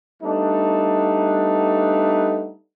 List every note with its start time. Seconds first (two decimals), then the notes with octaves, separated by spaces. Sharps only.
0.23 G3 A3 B3 D4 D#4